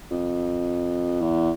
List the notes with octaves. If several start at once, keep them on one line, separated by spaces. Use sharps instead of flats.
F2
E2